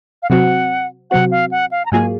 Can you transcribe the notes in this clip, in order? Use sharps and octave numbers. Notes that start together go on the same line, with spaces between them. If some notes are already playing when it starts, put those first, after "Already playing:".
F5
C3 F#3 C4 F#4 F#5
C3 F#3 C4 F#4 F#5
F5
F#5
F5
A#5
G#2 F#3 A#3 F4 G#4 G#5